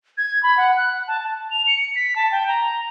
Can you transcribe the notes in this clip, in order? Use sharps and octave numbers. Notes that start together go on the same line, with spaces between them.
G#6
B5
F#5
F#6
A5
A5
F7
C#7
B6
A5
G5
A#5